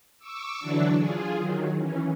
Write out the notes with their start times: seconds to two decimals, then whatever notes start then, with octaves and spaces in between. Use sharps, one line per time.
0.19 C#6 D6 E6
0.59 D3 E3 F#3 D4
0.97 F4 G#4
1.35 D#3 F#3
1.78 E3 C#4